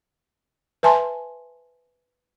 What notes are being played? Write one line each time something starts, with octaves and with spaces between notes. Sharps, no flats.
B4 E5 G#5 A5 C6